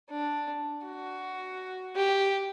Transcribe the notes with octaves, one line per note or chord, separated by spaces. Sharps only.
D4
F#4
G4